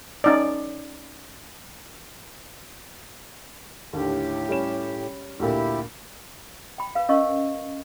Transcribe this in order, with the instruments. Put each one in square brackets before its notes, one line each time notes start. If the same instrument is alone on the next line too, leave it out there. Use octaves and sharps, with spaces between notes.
[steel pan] C#4 D#4 D5
[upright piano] D#2 D3 [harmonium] A2 G4
[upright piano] G3 C#4 E7
[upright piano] D2 A#2 [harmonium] E4 G4
[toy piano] G5 B5
B4 F5
C#4 A#4 D#5 F5 C#6